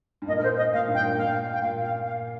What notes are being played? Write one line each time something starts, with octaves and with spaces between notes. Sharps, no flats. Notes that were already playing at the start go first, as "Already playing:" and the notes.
G2
A#2 D#5
A#4
C5
D#5
A#2 F5
G2
G5
A#2
A#2 F5
G5
A#2 F5
F5
F5